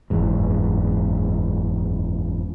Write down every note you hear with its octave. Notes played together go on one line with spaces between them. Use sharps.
F#1 E2 G#2